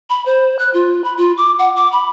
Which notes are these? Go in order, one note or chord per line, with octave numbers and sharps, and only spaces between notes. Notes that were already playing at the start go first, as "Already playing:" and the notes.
B5
C5
F#6
F4
B5
F4
D6
F#5
D6
B5